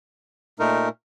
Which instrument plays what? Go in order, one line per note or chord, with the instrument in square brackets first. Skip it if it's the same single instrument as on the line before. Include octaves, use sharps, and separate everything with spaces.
[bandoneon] A#2 A3 D#4 A#4